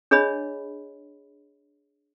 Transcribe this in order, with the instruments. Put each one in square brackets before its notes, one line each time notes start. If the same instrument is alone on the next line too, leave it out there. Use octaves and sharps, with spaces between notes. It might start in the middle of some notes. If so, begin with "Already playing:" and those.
[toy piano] D4 G#4 C#5 D#5 B5